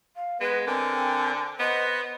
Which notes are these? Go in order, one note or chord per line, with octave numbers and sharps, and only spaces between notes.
F5
G#3 B3 B4
D3 C4 A#4 G5 G#5
B3 C5 D#5 F#5